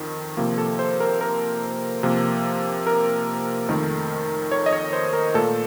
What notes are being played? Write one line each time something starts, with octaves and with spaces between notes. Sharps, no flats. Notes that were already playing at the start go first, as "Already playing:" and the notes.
Already playing: F2 D#3
C3 F3 A#3
A4
C5
A#4
A#4
C3 F3 A#3
A#4
F2 D#3 A3
C#5
D#5
C#5
C5
A#4
A#2 A3 A4